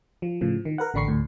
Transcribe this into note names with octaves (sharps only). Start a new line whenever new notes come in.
F3
A2 C#3 F3
D#3
A#4 B4 F#5
A1 D3 D4 B5 C#6 C7
D2 A2